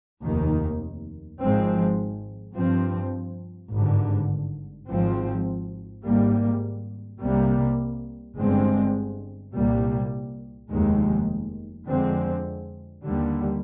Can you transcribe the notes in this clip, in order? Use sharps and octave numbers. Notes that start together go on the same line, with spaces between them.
F1 D#2 D#3
G#1 G#2 F3 G#3 C4
G2 F3 C4
G#1 G2 D3
G#1 G#2 F3 C4
G#1 G#2 G3 A#3
C2 C3 G3 A#3
G1 G2 D3 G#3 C4
C2 A#2 G3 A#3
F1 D#2 D#3 G#3
F2 D3 G#3 C4
D#2 D3 G3